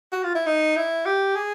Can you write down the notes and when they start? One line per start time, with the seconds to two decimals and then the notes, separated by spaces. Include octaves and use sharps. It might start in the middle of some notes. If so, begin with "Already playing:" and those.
0.12 F#4
0.24 F4
0.35 E4
0.46 D#4
0.77 E4
1.06 G4
1.35 G#4